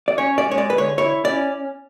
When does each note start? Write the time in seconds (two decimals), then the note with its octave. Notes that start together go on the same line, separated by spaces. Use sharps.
0.08 D5
0.18 C#4 C#5
0.38 D5
0.45 G#3
0.51 C#5
0.58 D5
0.70 D3 B4
0.78 C#5
0.98 E4 C#5
1.24 C#4 D5